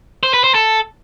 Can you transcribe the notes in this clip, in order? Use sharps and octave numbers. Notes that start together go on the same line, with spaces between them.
C5
B4
C5
A4